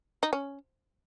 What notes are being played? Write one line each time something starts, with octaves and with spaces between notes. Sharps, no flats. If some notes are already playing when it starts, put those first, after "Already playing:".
D#4
C#4